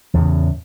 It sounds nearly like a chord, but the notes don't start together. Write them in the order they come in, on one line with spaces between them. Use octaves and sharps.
E2 A2 C#3